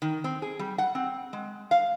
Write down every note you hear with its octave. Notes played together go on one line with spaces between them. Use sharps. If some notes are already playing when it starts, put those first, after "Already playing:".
D#3
C4
G#4
G3
F#5
C4
G#3
F5